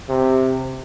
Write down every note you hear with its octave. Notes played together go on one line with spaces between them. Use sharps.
C3